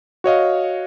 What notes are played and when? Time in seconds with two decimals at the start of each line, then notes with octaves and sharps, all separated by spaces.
0.24 F#4 C#5 D#5 F5